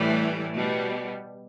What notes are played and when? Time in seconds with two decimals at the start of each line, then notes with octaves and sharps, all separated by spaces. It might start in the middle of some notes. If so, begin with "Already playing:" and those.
Already playing: A2 E3 G3 A3
0.55 B2 G3